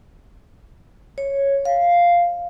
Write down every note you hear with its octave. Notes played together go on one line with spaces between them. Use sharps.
C#5
F5